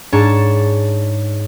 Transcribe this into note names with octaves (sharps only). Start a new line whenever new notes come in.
G#2 D4 C#5 A5